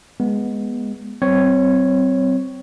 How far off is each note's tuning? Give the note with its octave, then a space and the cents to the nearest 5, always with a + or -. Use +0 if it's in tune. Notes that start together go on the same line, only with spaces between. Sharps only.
G#3 +0 B3 -10
G3 -45 C4 -10 C#5 +0